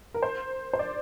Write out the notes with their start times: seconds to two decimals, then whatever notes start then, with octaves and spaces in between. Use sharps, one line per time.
0.14 A#4
0.23 C5
0.73 C5
0.79 D5